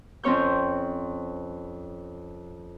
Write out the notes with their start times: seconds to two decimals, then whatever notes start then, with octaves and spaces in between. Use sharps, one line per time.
0.23 F2 C4 C#4 C#5 C#6 G6